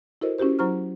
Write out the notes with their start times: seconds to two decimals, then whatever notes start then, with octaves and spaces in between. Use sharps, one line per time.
0.21 E4 F#4 A4 A#4 C5 D#5
0.39 C#4 E4 F#4 G4 C5
0.59 F#3 E4 C5 A#5 C#6 F6